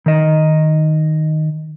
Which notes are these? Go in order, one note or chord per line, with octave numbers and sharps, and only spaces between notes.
D#3 D#5